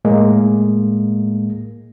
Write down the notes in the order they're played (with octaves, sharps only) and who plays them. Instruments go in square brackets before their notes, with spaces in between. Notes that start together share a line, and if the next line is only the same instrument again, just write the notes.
[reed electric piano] A2 G#3 A#3